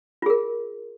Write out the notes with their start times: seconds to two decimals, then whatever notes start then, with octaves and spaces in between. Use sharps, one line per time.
0.22 F4
0.26 G#4
0.30 A#4